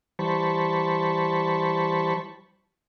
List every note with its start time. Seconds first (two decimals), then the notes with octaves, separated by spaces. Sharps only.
0.19 E3 G3 C5 A5 B5 C#6